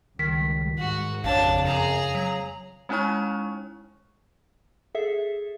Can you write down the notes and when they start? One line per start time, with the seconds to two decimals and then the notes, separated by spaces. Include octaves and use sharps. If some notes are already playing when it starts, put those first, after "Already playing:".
0.19 C#2 D#3 G3 B6
0.78 G#2 F#4
1.24 A1 F2 C#3 D4 C#5 F5 A5
1.65 F#2 G#4 A#5
2.15 F#3
2.89 G#3 C#4 D#4 E4 C#5 C#6
4.95 G#4 A4 E5